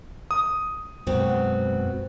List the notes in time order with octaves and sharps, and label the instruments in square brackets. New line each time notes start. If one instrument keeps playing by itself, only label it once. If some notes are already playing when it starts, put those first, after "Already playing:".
[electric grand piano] D#6
[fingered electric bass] F#2 B2 G#3 [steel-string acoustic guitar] B3 C4 F#4